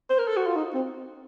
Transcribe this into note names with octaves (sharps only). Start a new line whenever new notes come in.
C5
A#4
A4
F#4
F4
D#4
C4